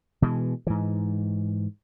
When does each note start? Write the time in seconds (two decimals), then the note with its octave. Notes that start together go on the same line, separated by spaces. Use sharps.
0.22 B2 E3 G#3
0.67 G#2 E3